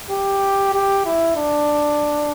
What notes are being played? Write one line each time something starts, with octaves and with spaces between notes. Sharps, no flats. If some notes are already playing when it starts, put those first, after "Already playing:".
G4
G4
E4
D4